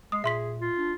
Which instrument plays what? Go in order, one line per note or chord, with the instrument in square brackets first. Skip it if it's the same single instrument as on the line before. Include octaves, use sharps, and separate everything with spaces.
[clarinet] G#3 [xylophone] D#6 [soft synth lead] C7
[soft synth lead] A#2 [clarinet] G#4 [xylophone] E5 C6 B6
[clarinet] F4
[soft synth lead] D4